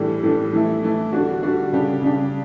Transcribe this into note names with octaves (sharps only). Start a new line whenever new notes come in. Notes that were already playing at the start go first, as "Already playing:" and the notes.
Already playing: A2 E3 G3 D4
A2 E3 G3 D4
E3 A3 E4
E3 A3 E4
D3 G3 D4 F#4
D3 G3 D4 F#4
C#3 G3 D4 G4
C#3 G3 D4 G4